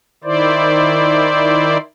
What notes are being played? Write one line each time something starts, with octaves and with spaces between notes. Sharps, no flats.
D#3 E4 C5 D5